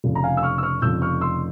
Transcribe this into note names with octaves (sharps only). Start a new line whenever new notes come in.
F1 F2 C#3
A#5
F5 G#5
E6
C#6 F6
E6
C#6 F6
F1 F2 C#3 E6 G6
C#6 F6
C6 E6